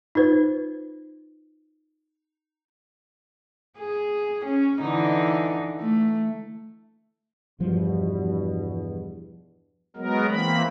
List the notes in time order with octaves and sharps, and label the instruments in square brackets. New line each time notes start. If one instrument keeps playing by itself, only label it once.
[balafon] D#4 F4 B4 C5
[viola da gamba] G#4
C#4
D3 E3 D#4
A3
[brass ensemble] E2 G2 B2 [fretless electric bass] F3
[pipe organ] F#3 G#3 B3 A#4
E3 A#3 C4 B5